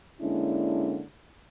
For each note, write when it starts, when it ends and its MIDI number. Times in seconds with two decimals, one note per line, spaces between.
0.21 1.01 50
0.21 1.01 56
0.21 1.01 58
0.21 1.01 61
0.21 1.01 62
0.21 1.01 64